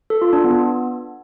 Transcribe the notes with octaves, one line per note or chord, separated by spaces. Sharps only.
A4
F4
D4
B3